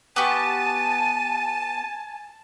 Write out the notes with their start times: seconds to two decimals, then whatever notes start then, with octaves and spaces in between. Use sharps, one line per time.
0.16 B3 G4 G#5 A5 C#6 D#7